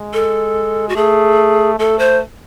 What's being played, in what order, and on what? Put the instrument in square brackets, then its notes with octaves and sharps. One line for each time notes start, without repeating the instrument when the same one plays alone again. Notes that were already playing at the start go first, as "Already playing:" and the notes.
Already playing: [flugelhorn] G#3
[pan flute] A4
F#4
[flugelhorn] A3 [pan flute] G#4
[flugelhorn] A3 [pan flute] A4
[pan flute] C5